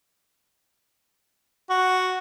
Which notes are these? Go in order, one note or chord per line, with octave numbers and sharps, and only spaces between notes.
F#4